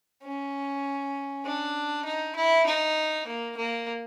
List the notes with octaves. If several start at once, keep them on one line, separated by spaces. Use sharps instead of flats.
C#4
D4
D#4
E4
D#4
A#3
A#3